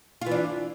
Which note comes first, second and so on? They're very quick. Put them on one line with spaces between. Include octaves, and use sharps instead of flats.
F4 E3 D4